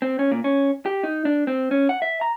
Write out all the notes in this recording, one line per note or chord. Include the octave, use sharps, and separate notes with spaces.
C4
C#4
A#2
C#4
G4
D#4
D4
C4
C#4
F#5
E5
A#5